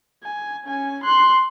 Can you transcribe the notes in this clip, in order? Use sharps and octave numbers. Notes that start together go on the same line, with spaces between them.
G#5
C#4 G#5
C6 F#6